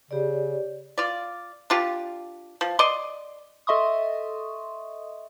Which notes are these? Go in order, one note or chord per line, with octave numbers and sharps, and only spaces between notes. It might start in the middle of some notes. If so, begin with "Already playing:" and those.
C#3 G4 C#5 D5
F4 D5
D4 F4 G4
F3
D5 D#5 C6
A4 D#5 E5 C6 C#6 D#6